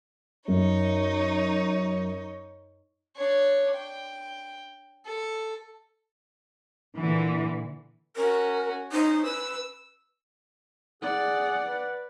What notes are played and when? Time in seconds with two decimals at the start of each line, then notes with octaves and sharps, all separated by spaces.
0.48 F#2 D#4 C#5
3.17 D4 C#5
3.76 G5
5.06 A4
6.96 A#2 D3 E3
8.16 C#4 F#4 A#4
8.92 C#4 D#4 C5
9.25 B4 E6
11.02 G#4 D5 F#5
11.62 B4